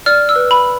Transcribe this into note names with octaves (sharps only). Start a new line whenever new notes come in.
D5 F6
E6
B4
B5